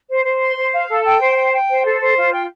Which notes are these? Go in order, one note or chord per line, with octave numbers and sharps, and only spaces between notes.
C5
C5
C6
C5
F5
A4
G5
C5
G5
G5
C5
A4
C5
F4
G5